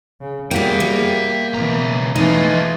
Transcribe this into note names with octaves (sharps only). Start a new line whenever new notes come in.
C#3
G3 A#3 F#4 G#4 E5 G5
A#3
C#2 B2 E3 A#5
E3 G#3 A3 D#4 F4